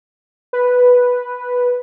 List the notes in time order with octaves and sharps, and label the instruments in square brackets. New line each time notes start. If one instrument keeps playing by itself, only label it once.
[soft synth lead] B4